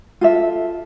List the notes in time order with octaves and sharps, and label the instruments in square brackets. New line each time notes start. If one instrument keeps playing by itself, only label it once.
[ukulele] F4 A4 E5